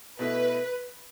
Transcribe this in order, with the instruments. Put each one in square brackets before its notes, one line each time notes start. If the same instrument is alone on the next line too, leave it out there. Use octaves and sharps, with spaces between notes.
[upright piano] B2 A3 E4 [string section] B4